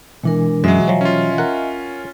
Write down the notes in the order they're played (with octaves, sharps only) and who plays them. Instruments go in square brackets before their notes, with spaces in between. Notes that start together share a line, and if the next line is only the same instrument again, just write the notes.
[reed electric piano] B2 E3 [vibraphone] G#3 D4 A#4
[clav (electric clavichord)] F#2 [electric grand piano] F#3 G#3 [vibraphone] D#5 E5 G#5
[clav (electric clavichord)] F3 F#3
[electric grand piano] C#4 F4
[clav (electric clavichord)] A#4 F#5